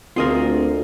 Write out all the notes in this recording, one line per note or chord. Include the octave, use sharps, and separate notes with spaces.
D2 C4 F4 G#4 A#4 D#5 A#5